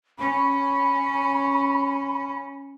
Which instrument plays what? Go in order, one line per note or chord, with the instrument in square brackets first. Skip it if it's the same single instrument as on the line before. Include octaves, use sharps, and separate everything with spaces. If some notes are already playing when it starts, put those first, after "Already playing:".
[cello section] C#4 [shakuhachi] B5